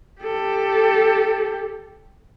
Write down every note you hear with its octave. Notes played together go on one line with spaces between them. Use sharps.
G4 A4